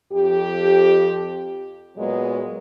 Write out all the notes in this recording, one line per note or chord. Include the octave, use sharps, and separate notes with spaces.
F2 G4
A#2 F#3 G#3 B3